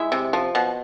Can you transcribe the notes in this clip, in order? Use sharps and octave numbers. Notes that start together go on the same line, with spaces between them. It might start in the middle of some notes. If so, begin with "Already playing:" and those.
Already playing: G#3 E4 E5
C3
F3
B2